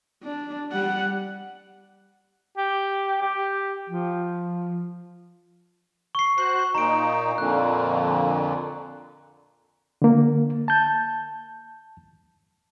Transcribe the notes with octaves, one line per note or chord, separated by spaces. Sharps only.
D4
G3 F#5
G4
G4
F3
C#6 C7
F#4 C5 F#6 C7
A#2 D#4 A#5 D7
F2 A#2 D3 F#6
D3 A#3
A5 G6